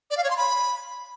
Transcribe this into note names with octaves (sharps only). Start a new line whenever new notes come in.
D5
F5
C#5
C6
B5